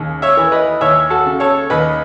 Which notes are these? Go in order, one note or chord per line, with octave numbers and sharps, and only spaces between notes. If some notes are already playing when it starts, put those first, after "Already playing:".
Already playing: D#2 C#3
C#5 E5
E3
B4 D#5
D#2 C#5 E5
F#4 A4
C#3
A4 C#5
D#2 B4 D#5